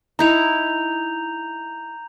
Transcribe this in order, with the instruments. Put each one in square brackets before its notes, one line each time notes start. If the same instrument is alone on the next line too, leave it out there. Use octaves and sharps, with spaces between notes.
[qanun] D#4 E4 [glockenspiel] A#5 G6 F7